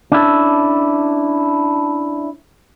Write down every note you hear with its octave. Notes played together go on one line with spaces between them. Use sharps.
C#4 D4 E4 A4